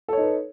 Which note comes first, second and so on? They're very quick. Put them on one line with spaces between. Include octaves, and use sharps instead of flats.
A4 C#5 D#4 B4